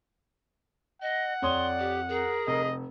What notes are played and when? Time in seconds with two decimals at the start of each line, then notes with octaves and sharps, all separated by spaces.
1.02 D#5 F#5
1.42 F2 C#5 D5 C6 D#6
1.79 G4
2.09 G#4 A#4
2.47 F1 D#5